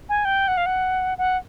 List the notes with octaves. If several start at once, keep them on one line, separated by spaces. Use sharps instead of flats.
G#5
G5
F#5
F5
F#5
F#5